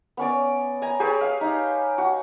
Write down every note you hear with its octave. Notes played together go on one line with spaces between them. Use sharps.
B3 C#4 D5
G#5 A#5
G4 G#4 B4 C#5
F5
D#4
F#4